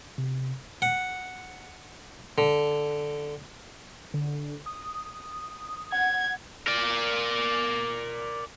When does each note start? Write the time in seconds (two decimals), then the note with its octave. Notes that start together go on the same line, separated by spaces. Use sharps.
0.18 C3
0.82 F#5
2.38 D3
4.14 D3
4.66 D#6
5.92 F#5 G#6
6.67 A#4 D5